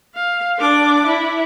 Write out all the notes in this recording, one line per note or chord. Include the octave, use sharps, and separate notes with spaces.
F5
D4 D6
E4